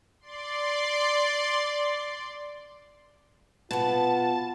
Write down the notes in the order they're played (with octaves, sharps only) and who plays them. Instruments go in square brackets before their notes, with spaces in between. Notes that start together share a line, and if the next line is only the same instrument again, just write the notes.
[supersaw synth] D5 C6
[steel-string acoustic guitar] B2 B3 [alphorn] F4 [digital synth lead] A5